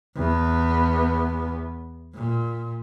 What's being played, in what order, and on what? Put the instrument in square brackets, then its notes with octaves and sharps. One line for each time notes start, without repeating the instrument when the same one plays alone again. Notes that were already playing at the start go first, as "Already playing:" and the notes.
[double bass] E2 B3
A#2